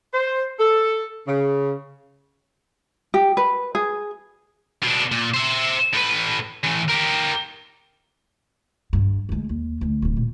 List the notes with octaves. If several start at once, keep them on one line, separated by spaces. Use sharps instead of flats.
C5
A4
C#3
G4
B4
G#4
B2 D4
A#2
C5 E5
A2 B4
A2 E3
G4 A#4
G2
D2 G#3
D#2
D2
D1 G3
A#2